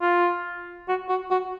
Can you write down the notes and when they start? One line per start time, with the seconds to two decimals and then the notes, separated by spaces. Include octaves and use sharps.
0.01 F4
0.88 F#4
1.09 F#4
1.30 F#4